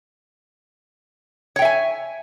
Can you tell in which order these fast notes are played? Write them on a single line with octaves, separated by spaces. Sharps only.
C#5 G5 E5 G#5